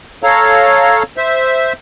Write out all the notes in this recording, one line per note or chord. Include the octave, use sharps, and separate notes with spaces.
A4 C#5 F5 A#5
C5 E5